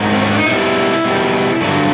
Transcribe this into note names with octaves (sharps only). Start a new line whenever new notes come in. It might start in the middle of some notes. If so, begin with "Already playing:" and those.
Already playing: G#2 D#3 F#3
C4
C#4
D4
D#4
B2 G3 E4
B2 G3
G2 D3 F#3